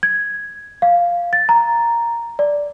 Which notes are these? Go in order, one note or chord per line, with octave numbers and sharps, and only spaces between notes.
G#6
F5
A6
A#5
D5